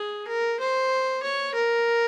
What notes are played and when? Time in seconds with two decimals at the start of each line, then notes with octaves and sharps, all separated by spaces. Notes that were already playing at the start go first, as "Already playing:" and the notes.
Already playing: G#4
0.27 A#4
0.60 C5
1.23 C#5
1.54 A#4